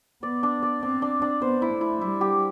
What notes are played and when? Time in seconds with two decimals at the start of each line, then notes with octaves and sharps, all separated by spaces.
0.23 B3 D5
0.43 D4
0.63 D5
0.82 C4 D4
1.02 D4
1.22 D4
1.42 B3 C5
1.62 E4
1.72 A3
1.81 E4
2.01 G3 E4
2.21 G4